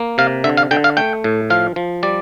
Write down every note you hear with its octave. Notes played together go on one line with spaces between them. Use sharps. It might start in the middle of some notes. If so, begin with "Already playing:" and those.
Already playing: A#3
C3 F5
D3 E5
F5
D3 G5
F5
A3 G5
A2
F3 F5
F3
G3 D5